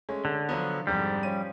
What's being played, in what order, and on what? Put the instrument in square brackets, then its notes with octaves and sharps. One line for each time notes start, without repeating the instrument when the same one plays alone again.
[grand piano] G#3 A3 C#4
[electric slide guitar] D3
[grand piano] F3 F#3 B3
[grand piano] F2 G#2 D3 [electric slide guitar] G3
[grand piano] F3 C#4 D#7